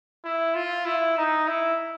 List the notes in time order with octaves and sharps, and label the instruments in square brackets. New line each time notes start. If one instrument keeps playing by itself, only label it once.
[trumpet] E4
F4
E4
D#4
E4